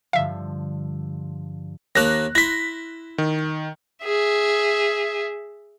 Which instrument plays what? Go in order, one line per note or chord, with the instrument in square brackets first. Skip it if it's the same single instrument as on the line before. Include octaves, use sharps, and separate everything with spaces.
[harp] G2 D3 F3 [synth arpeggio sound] E5 F5
[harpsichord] D#2 A#3 A5 [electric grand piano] F#6 A#6
[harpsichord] E4 C6 [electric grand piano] A#6 B6
[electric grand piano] D#3
[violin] G#4 E5